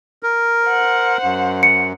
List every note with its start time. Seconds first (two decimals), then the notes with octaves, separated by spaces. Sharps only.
0.23 A#4
0.67 C5 F#5
1.23 F#2
1.63 C#7